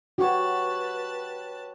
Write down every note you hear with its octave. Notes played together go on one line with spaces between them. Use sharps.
F#4 G4 B4 C#5 A5